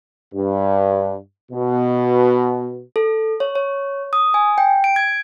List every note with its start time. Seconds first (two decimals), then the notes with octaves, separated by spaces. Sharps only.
0.34 G2
1.52 B2
2.96 A4
3.40 C#5
3.55 C#5
4.13 D#6
4.34 G#5
4.58 G5
4.84 D7
4.96 G#6